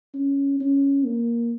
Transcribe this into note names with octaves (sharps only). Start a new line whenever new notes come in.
C#4
C#4
A#3